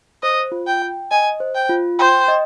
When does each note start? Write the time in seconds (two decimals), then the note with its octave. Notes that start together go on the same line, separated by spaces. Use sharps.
0.23 C5 D#5
0.52 F4
0.67 G5
0.82 G5
1.11 D#5 G#5
1.40 C5
1.55 G5
1.69 F4
1.99 C5 G5
2.28 D#5